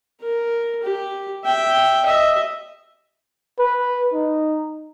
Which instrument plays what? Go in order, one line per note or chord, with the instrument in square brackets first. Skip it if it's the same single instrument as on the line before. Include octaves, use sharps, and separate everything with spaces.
[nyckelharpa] A#4
G4
E5 G5
D#5 E5
[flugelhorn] B4
D#4